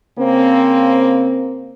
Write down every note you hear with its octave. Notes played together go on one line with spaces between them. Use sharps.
C#3 A#3 C4